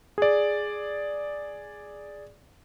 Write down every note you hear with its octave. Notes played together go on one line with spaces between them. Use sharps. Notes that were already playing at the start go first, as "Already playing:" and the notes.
G#4 D5